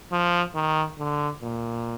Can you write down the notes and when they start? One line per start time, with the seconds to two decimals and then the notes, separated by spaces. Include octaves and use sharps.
0.12 F3
0.55 D#3
0.99 D3
1.42 A#2